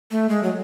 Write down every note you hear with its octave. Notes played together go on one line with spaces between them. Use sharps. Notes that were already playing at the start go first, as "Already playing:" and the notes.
A3
G#3
F#3